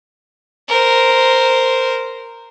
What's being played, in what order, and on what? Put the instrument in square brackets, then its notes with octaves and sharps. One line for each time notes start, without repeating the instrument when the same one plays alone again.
[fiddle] A#4 C5